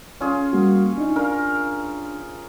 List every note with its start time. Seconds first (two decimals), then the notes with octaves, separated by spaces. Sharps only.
0.20 C#4 F4 G#4
0.53 G3 A#3 F#4
0.98 D4 D#4
1.16 D4 A#4 F5